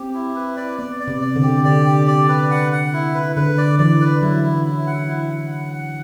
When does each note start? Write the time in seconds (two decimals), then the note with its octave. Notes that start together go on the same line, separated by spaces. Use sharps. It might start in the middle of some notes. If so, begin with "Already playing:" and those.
Already playing: C4 G4
0.14 E4
0.35 B4
0.57 D5
0.79 B3 D5
1.00 D5
1.07 C3
1.22 D5
1.36 D3
1.43 G4
1.64 D3 D5
1.86 G4
2.07 D5
2.29 B4
2.51 F#5
2.72 F#5
2.93 E4
3.14 B4
3.36 D3 B4
3.58 D5
3.79 E3 D5
4.01 B4
4.22 F#3 E4
4.44 E4
4.65 E4
4.87 F#5
5.08 E4
5.30 F#5
5.51 F#5
5.73 F#5